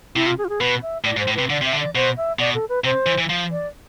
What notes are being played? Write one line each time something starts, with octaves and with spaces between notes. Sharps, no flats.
C3 E4
F4
G#4
F4
G#4
B2 B4
E5
A2 D5
G#2
C5
A2
C3 B4
D3 D5
C3 E5
D3
D5
B2 C5
E5
B2 D5
A4
B4
C3 C5
E3
E3
F3
D5